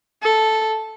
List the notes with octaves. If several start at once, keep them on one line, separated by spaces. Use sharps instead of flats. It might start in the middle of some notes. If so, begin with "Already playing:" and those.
A4